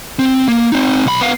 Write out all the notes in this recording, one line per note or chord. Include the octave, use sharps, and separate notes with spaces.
C4
A#3
C4 D#4
B1 B5
B3 F5